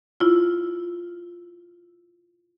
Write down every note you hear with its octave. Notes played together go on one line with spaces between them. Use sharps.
E4 F4